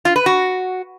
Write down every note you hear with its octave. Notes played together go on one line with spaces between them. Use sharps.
F4
B4
F#4